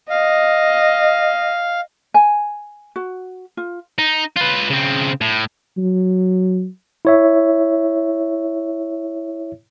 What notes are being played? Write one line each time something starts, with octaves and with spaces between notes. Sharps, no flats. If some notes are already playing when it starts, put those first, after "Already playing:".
D#5 F5
G#5
F#4
F4
D#4
F4 B4
C#3 C4
A2
F#3
E4 C#5 E5